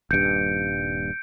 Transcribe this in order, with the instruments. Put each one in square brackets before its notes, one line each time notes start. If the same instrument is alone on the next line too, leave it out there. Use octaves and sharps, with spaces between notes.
[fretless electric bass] D#1 G2 [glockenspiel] G6 C#7 D7